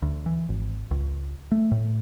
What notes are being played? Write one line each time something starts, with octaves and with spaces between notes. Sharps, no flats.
D2
E3
G#1
C#2
A3
A2